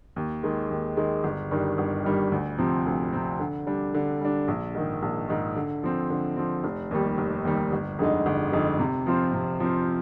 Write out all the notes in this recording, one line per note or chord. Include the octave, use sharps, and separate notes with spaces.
D#2
D#3 G#3
D#2
D#3 G#3
G1
G2 D#3 G3
G1
G2 D#3 G3
D2
C3 F3 C4
D2
C3 F3 C4
D3
G3 D4
D3
G3 D4
A#1
G#2 D#3
A#1
G#2 D#3
D3
F3 C4
D3
F3 C4
F1
D#2 D#3 G3
F1
D#2 D#3 G3
G1
F2 D3 G#3 D#4
G1
F2 D3 G#3 D#4
C3
F3 C4 F4 C5
C3
F3 C4 F4 C5